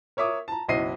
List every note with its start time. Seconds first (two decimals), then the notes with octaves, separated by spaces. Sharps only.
0.17 A#4 C#5 E5 D6 D#6
0.48 A5 A#5
0.68 F#1 B1 E4 D#5 C7 D#7